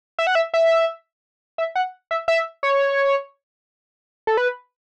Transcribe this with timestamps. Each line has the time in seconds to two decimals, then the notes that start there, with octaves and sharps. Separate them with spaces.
0.19 E5
0.27 F#5
0.35 E5
0.54 E5
1.58 E5
1.76 F#5
2.11 E5
2.28 E5
2.63 C#5
4.27 A4
4.37 B4